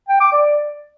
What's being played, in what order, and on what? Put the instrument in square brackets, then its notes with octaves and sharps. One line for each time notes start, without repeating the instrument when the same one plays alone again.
[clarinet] G5
D6
D5